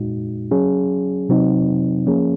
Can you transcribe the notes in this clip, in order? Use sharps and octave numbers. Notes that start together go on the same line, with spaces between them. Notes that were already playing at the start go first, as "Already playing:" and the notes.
Already playing: A#2 G#3 D#4 F#4
F#3 C#4 G#4
C3 F#3 C4 D#4
F3 A#3 C#4 G#4